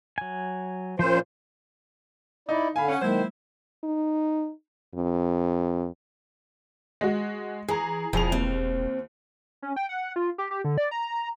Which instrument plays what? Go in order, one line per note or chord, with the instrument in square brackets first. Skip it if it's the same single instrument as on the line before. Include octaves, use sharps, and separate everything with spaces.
[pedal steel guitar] F#3 G#5
[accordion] A#2 C5 [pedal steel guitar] F3 C#4
[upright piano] D#4 [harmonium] E4 D5
[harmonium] D3 F5 [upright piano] G#5 B5
[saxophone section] C#4 [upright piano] F#5
[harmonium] D#3 [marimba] F#3 G#3 A#3 [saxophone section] E4 C5
[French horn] D#4
F2
[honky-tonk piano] G#3 F#4
[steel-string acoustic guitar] E3 [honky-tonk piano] G#4 A#5
[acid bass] E1 [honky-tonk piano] F2 G#4 F7 [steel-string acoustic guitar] F3
[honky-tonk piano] D#2 [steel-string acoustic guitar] C4
[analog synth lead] C#4
G5
F#5
F4
G4
G4
D3
D5
A#5
A#5